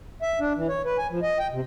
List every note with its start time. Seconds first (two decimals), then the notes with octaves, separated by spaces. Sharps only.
0.22 E5
0.40 D4
0.56 E3
0.68 C#5
0.85 B4
0.98 G#5
1.10 F3
1.22 D#5
1.39 G5
1.52 C3